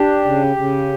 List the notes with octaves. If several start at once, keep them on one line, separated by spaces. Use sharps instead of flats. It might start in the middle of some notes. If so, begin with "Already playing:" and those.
Already playing: D4 G4
C#3
C#3